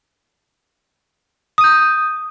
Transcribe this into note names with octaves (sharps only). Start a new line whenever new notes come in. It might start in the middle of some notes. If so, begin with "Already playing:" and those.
D#6 G6 D#7